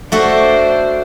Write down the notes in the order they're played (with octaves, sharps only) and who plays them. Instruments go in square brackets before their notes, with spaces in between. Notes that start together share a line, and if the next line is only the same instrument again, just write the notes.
[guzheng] A3 F#4 A4 [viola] D4 C5